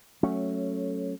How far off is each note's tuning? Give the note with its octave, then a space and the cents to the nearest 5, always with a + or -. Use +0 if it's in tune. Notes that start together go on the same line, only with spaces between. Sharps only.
F#3 +0 A3 +0 C#4 -10